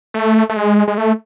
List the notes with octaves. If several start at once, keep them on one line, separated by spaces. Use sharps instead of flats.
A3
A3
G#3
G#3
A3